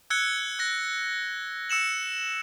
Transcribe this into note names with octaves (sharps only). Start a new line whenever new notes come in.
E6 F#6 G#6 C#7 G7
F#6 A#6
E6 C#7 E7 F#7